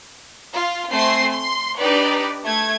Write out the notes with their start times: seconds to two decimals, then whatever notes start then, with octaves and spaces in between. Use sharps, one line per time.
0.51 F4
0.93 A3 C4 G#5 C6 C7
1.31 C6
1.79 D4 D#4 G4 B4 D5
2.45 A3 G#6